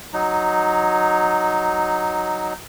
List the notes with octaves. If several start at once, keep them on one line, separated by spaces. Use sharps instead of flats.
F#3 D#4